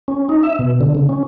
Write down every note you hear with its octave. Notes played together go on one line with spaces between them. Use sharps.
C#4
D#4
E5
B2
D3
C#3
C#4